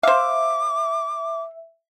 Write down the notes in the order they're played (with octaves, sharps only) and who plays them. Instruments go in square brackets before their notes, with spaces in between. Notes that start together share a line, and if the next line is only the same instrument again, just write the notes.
[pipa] C5 F5 [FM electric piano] E5 [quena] D6